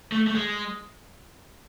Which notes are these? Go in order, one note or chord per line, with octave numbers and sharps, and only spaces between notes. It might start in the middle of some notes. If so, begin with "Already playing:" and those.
A3
A3
G#3